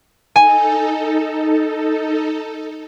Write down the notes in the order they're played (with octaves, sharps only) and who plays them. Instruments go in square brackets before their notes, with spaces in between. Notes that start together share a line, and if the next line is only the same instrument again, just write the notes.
[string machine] D#4 A4 [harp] G#5